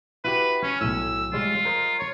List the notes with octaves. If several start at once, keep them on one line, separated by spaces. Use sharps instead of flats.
E4 F#4 G4 B4
C#4
B1 A2 E6
G3 G#3 F4 C#5
A#4 C5 D#5
C#5